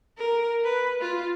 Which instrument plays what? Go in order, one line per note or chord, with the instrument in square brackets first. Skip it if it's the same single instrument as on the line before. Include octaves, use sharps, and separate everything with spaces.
[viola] A#4
B4
F4